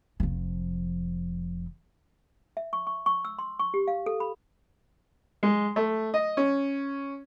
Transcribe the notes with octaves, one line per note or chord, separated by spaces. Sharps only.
F1 F3
E5
C#6
C#6
C#6
E6
C6
C#6
G4
F5
A4
B5
G#3
A3
D#5
C#4